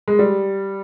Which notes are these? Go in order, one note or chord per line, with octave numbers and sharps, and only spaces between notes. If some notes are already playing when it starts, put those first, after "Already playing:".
G#3
G3